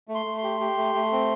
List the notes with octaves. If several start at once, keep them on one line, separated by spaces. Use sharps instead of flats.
A3
C6
A3
C6
G4
G4
A3
A3
C4